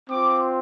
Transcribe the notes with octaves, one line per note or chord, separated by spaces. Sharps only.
C4 F4 D6